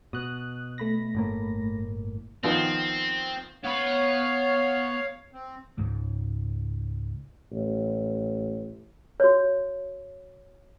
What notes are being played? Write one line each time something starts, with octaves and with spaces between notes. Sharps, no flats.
B2 D#6 F#6
A3 B5 A#6
G1 A2 A#3
D#3 F3 B3 C4
B3 C#5 F5 B5
C4
C#2 G#2
A1
F#4 C#5